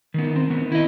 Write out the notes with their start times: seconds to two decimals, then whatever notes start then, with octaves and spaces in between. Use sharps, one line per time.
0.14 D#3 B3
0.36 C4
0.50 D#3 B3
0.72 E4 D#5